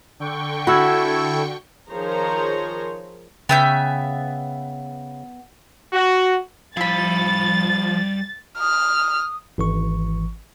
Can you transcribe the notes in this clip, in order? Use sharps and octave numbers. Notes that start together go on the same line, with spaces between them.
D3 G5 C#6
E4 F#4 A4 B5 E6 G#6
D#3 F3 G#4 C5 C#5 A#5
C#3 B3 E5 G5 G6
F#4
F3 G3 E4 F5 B5 A6
D#6 F6
G#1 E3 C#6